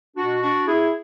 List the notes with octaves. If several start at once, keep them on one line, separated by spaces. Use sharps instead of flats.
B2 D4 F#4
D4 F#4
E4 G#4